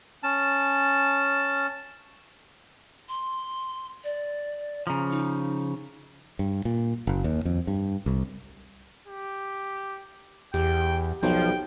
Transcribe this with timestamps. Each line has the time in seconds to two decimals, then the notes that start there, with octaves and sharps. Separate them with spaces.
0.23 C#4 A5
3.09 C6
4.04 D5
4.87 C#3 F3 A#5
5.10 D#4
6.39 G2
6.65 A#2
7.07 F#1
7.24 D#2
7.45 F2
7.67 G2
8.06 C2
9.08 G4
10.54 E2 G4 G5
11.23 B1 F3 G5